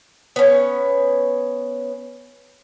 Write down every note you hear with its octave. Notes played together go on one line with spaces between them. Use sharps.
B3 C#4